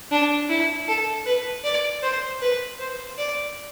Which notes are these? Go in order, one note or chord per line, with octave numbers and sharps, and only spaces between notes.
D4
E4
A4
B4
D5
C5
B4
C5
D5